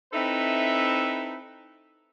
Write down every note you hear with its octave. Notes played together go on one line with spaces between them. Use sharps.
C4 D#4 E4 A4 B4 E5